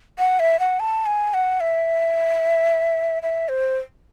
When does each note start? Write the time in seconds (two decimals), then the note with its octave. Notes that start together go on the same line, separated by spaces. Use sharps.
0.19 F#5
0.40 E5
0.60 F#5
0.80 A5
1.06 G#5
1.34 F#5
1.60 E5
3.23 E5
3.49 C5